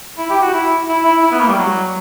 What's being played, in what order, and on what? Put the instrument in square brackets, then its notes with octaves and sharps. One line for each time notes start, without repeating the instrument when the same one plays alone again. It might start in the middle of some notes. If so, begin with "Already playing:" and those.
[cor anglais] E4
G4
F#4
E4
E4
E4
E4
B3
A#3
G3
F#3